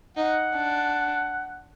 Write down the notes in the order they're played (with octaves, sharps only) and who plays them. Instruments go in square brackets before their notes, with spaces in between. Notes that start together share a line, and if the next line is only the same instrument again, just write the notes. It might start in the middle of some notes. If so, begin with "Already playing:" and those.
[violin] D#4 [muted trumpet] F#5
[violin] D4